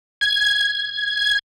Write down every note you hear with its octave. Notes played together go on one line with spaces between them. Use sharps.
G#6